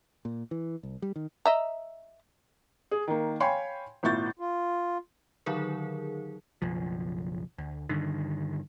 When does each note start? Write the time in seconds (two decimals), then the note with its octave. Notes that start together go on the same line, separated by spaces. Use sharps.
0.25 A#2
0.51 E3
0.83 C2
1.02 G3
1.16 D#3
1.45 D#5 E5 A#5
2.91 G#4
3.08 D#3 A#3
3.40 C#5 F5 G5 G#5 B5 C6
4.03 G#1 A#2 E4 C#6 G6 A6
4.39 F4
5.46 D3 D#3 F#3 D#4 G#4 A#4
6.62 F#1 B1 F3
7.58 D2
7.89 G2 D3 D#3